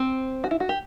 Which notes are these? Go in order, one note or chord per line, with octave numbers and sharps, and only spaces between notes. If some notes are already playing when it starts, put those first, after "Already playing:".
Already playing: C4
F#4
E4
F#4
G4